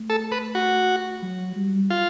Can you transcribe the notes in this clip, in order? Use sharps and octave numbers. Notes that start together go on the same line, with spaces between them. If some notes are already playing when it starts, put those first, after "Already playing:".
Already playing: A3
A4
B4
F#4
F#3
G3
F4